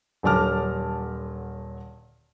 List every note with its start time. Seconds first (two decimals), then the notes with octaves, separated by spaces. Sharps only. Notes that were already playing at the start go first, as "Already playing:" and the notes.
0.23 D#1 D3 F#3 A5 D6 F6